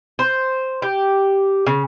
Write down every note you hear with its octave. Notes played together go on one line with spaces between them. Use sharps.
C5
G4
C#3